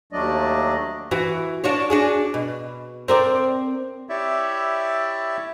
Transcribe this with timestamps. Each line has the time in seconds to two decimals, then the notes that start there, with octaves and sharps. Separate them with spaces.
0.13 D#2 F#3 A3 D4 D5 D#5
1.11 E3 F#4
1.64 D4 F#4 C#5
1.90 D4 F#4 G#4
2.34 B2
3.08 C4 A#4 D5
4.09 E4 G4 C#5 D5 E5